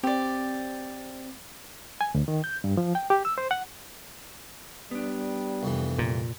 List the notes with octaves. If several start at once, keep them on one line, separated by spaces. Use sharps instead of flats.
C4 G4 D5
G#5
D2
D#3
G6
G2
F3
G5
G4
E6
C5
F#5
G3 B3 D4
C2 F2 E3
A#2